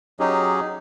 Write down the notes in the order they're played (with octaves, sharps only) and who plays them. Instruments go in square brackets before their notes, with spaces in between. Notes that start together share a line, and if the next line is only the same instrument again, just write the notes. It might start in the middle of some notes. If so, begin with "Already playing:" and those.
[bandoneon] F#3 C#4 D#4 G4 G#4